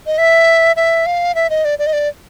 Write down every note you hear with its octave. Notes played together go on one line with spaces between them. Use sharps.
D#5
E5
E5
F5
E5
D#5
D5
D5
D#5
D5